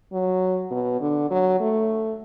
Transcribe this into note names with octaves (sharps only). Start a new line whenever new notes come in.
F#3
B2
D3
F#3
A3